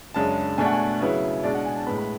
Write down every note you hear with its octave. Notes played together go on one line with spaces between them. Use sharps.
F#2 C#3 G#3 D4 A5
B2 A3 D4 G#5
F#5
G#5
C#3 F#3 B3 E4
B2 G#3 D4 D5
F#5
G#5
A5
A2 G#3 B3 B5
B5